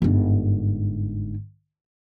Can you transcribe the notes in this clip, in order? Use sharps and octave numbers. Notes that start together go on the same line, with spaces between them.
G1 G#2